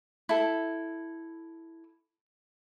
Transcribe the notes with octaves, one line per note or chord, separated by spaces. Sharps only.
E4 A4